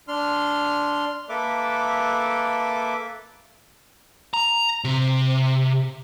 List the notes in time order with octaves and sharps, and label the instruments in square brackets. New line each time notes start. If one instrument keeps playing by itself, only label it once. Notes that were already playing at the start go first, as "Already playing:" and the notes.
[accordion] D4 C6 F6
[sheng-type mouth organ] A#3 A4 B4 E5 D6
[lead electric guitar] A#5
C3